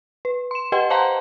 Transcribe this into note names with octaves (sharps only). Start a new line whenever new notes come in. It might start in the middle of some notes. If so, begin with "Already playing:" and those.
B4
C6 E7
G4 B4 D#5 F#5 G5 C6
C5 F5 F#5 A5 A#5 C6